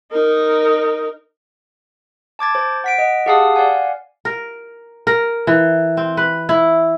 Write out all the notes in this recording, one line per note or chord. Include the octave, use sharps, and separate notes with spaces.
D#4 A#4
A5 D6 G#6 A6
C5 A6
F#5 B6 D7
D#5 F#5
G4 G#4 F5 F#5 A5 D#6
D5 F5 F#5 G#5
A#4
A#4
E3
C4
B4
E4